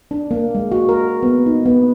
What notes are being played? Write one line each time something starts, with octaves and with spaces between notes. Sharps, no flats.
D4
A#3
G#3
F#4
A#4
B3
D#4
B3